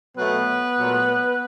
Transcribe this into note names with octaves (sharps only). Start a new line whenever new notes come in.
B2 F#3 A3 B3 B4
A#2 F#3 A3